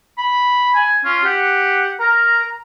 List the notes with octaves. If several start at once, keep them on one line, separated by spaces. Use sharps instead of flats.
B5
G#5
C#4 F4
G4 F#5
A#4 A#5